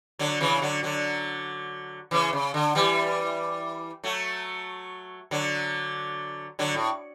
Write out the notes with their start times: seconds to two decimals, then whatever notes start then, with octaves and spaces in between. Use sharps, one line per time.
0.19 D3 F#3
0.41 C#3 E3
0.62 D3 F#3
0.83 D3 F#3
2.11 C#3 E3
2.33 C#3
2.54 D3
2.75 E3 G3
4.04 F#3 A3
5.31 D3 F#3
6.59 D3 F#3
6.75 A2